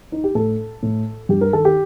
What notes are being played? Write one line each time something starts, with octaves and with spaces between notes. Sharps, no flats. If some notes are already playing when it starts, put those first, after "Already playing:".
D#4
G4
A2 A4
A2
G2 G4
A#4
D#3 A4
G4